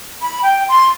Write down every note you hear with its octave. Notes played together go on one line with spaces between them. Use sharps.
B5
G5
C6